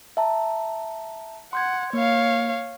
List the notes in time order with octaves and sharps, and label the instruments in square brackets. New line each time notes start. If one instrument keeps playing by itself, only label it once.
[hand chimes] E5 A5 A#5
[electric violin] F#5 [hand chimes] C6 G6 G#6
[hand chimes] A#3 [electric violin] C#5 F5